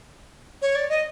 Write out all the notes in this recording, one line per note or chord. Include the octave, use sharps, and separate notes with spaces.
C#5
D5
D#5